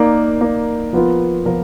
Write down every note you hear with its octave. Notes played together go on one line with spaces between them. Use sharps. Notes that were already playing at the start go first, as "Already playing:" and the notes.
Already playing: A#3 D#4 A#4 D5
A#3 D#4 A#4 D5
F3 B3 F4 A#4
F3 B3 F4 A#4